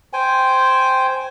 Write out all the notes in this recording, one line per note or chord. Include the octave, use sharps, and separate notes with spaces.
C5 G5 G#5